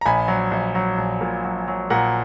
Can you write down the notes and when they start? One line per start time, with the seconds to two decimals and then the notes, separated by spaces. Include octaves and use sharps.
0.01 A#5
0.06 A#1 G#5 B5
0.28 F#3
0.51 A#1
0.75 F#3
0.98 A#1
1.21 A#2
1.44 F#3
1.68 F#3
1.90 A#2 F#5 A#5